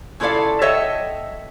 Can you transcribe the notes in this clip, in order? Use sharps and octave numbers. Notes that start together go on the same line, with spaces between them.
C#3 E4 F4 A4 D5 F5
A4 C#5 D#5 E5 F#5 G5